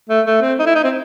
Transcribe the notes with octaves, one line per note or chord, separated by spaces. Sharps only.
A3
A3
C4
D#4
E4
D#4
C4